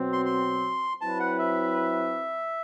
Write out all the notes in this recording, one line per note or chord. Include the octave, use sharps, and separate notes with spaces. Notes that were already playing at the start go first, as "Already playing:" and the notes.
Already playing: B2 F#3 C4
C6
C6
F#3 C4 E4 B4 A5
F#5
E5